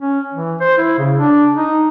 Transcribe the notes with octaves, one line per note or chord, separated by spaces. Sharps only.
C#4
E3
C5
E4
C#3
D4
D#4